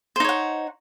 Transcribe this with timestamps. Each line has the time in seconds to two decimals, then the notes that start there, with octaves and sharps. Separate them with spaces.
0.16 C5
0.20 D#4
0.24 C#5
0.29 F#5